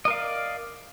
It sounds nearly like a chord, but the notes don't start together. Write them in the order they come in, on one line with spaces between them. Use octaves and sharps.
D#5 A#4 F5 D5